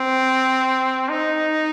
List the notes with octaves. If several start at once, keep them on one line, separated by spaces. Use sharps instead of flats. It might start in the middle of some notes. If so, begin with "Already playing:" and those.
Already playing: C4
D#4